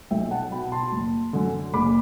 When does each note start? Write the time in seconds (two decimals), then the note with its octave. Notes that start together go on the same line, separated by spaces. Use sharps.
0.11 B1 E5 G5
0.31 F#5 A5
0.51 B2 G5 B5
0.72 A5 C6
0.92 F#1
1.33 F#2 D3
1.74 F#1 B5 D6